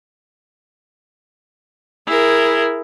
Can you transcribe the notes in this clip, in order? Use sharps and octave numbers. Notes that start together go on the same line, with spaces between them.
E4 G#4 A#4